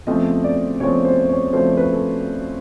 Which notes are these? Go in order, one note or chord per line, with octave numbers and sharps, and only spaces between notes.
E2 C#3 F3 A3 C4 D#5
D5
E2 C#3 F3 A3 C4 C#5
C5
C#5
E2 C#3 F3 A3 C4 C5
B4
A4